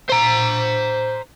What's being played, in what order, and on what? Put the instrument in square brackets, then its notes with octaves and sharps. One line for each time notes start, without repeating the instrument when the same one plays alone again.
[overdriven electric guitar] C5 A#5